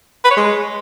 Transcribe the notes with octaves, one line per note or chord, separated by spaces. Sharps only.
B4
C#5
G#3